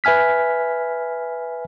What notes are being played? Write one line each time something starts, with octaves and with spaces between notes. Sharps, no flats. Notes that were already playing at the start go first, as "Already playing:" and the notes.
B4 E5 G#5 F6 B6